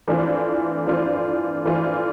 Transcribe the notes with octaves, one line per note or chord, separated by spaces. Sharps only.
E3 A3 D4 F4 C5
E3 A3 D4 F4 C5
E3 A3 D4 F4 C5